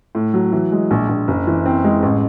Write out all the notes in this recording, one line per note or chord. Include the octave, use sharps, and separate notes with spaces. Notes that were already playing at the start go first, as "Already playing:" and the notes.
A2
F#3
E3
G#3
A#1
A#1
F#1
E3
C4
G#3
A1